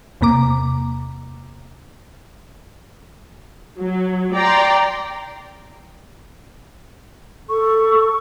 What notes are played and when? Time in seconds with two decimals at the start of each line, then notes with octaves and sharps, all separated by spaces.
0.21 E2 C3 A#3 A#5 D6
3.80 F#3
4.34 D5 G5 A#5 C6
7.49 A4 C#6